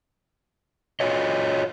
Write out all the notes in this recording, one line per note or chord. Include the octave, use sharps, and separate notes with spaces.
F4 F#4 C#5 D#5